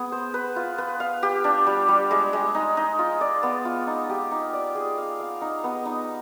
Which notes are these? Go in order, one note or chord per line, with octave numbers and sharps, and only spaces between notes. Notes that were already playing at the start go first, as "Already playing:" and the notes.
Already playing: B3 G#4
C5
B4
F4
B4
F5
G4
D4
G3
G3
G#3
G#3
D#4
D#4
F4
D5
B3
F4
D#4
G4
D#4
D5
G#4
F5
F5
D#4
B3
D#4